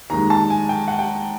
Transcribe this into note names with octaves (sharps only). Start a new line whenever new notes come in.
D#2 D#3 G#3 A#5
A5
G#5
G5
F#5
G5